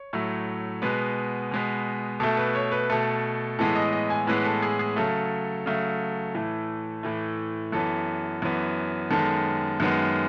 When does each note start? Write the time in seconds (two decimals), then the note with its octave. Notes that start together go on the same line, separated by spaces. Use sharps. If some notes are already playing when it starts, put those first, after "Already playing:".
Already playing: C#5
0.13 A2 F#3 A3
0.82 B2 G#3 B3 B4
1.51 B2 G#3 B3
2.20 B2 A3 A4
2.37 B4
2.55 C#5
2.72 B4
2.90 B2 A3 A4
3.59 A2 E3 G#3 B3 A4
3.76 D#5
3.93 D#5
4.10 G#5
4.27 A2 E3 G#3 B3 B4
4.45 A4
4.62 G#4
4.79 G#4
4.96 C#3 F#3 A3 A4
5.66 C#3 F#3 A3
6.34 A2 E3 A3
7.03 A2 E3 A3
7.72 F#2 E3 B3 A4
8.42 F#2 E3 B3
9.11 F#2 D#3 G#3 B3 A4
9.80 F#2 D#3 G#3 B3